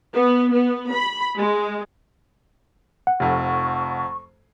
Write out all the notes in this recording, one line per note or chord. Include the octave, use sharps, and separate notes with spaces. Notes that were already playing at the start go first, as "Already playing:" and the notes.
B3
B3
B5
G#3
F#5
F1 F2 C#6